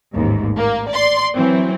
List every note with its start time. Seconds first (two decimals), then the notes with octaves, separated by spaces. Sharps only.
0.14 A1 D#2 G#2
0.58 A#3
0.88 D5 C6
1.35 E3 F#3 C4